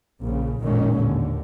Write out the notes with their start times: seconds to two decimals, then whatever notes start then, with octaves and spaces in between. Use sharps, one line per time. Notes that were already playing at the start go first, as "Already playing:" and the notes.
0.23 A#1 C#3
0.64 A1 F2 A#2 D#3 G#3 C#4
0.98 D#2 D3